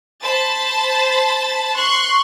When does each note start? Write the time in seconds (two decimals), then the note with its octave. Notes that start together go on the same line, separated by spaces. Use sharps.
0.23 C5 A5 B5 A6
1.75 C6 C#6 F#6